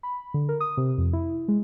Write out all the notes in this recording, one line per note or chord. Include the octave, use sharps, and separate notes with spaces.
B5
D3
A#4
D#6
C3
F2
E4
G#3